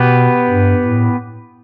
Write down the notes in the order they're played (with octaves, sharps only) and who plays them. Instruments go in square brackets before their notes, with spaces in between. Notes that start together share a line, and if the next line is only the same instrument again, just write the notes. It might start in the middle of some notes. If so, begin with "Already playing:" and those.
Already playing: [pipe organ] B2 [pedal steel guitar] B3 G4 B4
[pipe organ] G2
A2